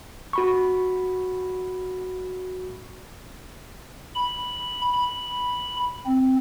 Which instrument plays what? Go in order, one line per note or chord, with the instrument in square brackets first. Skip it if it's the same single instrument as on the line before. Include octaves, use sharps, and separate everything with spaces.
[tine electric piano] F#4 B5 C#6
[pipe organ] B5
B5
C4